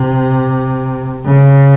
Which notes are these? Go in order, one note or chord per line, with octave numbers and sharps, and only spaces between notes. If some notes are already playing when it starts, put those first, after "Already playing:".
Already playing: C3
C#3